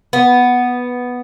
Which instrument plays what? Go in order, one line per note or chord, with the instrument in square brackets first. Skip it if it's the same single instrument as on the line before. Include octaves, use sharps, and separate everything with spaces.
[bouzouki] B3